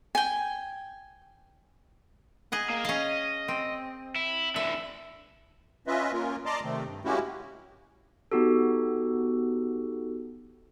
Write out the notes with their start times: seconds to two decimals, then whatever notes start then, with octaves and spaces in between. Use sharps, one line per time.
0.15 G5 G#5
2.52 G#4 D#5 F#5
2.69 A#3
2.85 C#4 D#5 F5
3.48 C4
4.16 E4
4.56 D3 E3 E5
5.87 C#4 F4 B4 D#5 E5
6.13 A#3 C#4 F4 A#4
6.46 D5 D#5 A5 A#5 C6 D6
6.64 C3 D#3 A3 C4
6.86 G2
7.05 G#3 A#3 C#4 E4 F#4 G4
8.32 B3 D#4 F#4 G4 A4